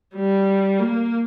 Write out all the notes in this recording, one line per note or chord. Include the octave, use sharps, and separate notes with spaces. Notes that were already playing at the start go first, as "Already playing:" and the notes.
G3
A#3